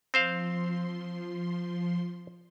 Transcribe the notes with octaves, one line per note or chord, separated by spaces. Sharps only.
F3 C4 C5 F5 C6